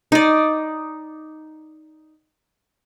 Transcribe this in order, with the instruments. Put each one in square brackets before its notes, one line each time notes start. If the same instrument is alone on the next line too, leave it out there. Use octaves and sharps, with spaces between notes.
[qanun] D#4 D5